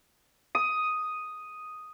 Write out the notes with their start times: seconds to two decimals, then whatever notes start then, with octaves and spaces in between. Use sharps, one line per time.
0.55 D#6